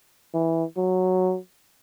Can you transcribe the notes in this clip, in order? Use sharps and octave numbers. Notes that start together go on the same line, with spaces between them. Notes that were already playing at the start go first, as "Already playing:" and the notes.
E3
F#3